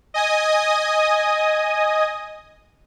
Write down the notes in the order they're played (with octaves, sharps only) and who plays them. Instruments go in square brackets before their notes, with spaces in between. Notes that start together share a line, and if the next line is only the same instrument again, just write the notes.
[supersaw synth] D#5 G#5 D#6